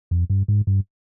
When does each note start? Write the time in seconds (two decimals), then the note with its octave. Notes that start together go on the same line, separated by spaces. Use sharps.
0.11 F2
0.30 G2
0.48 G#2
0.67 G2